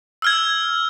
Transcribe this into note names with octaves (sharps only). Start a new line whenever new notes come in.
E6 F6 G#6